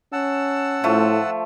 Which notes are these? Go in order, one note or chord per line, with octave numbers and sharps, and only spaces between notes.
C#4 F#5 A5 E6
A2 F3 A3